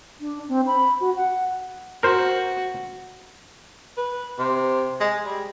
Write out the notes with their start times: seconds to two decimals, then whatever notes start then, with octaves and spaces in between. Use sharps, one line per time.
0.20 D4
0.49 C4
0.67 B5
1.00 F#4
1.16 F#5
2.03 F#4 A#4 C5
3.98 B4
4.39 C3
5.00 G#3
5.26 G3